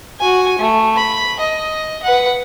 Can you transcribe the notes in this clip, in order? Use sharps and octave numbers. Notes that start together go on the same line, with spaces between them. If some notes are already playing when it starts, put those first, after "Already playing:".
F#4 G#5
A3
B5
D#5
B4 F#5